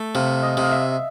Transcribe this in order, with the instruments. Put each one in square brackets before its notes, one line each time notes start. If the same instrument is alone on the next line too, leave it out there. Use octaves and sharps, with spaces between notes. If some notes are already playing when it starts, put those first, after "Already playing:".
Already playing: [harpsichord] A3
[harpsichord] C3 [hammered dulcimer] F5
[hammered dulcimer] D#5
[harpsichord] C3 [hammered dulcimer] F5
[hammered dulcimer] E5